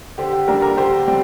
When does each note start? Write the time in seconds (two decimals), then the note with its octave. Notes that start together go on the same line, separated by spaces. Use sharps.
0.18 D3 G4 C5
0.33 G4
0.48 G3 A#3 D4 A#4
0.62 A#4
0.77 D3 G4 C5
1.07 G3 C4